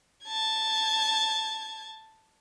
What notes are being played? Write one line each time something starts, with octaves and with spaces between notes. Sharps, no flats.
A5 G#6